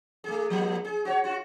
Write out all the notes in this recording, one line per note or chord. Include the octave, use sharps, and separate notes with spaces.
A3 G#4
F3 A#3
G#4
F#4 C5 C#5
F4 F#4